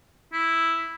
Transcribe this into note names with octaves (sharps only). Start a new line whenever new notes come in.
E4